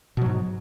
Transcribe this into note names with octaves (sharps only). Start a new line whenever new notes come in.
G#2 B2 F#3